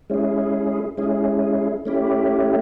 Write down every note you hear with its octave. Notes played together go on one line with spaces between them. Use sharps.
G#3 C#4 E4 G#4
G#3 C#4 E4 G#4
A3 C#4 E4 G4